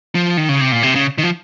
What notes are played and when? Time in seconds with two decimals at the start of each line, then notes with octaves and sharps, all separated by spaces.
0.15 F3
0.37 D#3
0.49 C#3
0.61 C3
0.72 A#2
0.83 C3
0.95 C#3
1.18 D#3
1.23 F3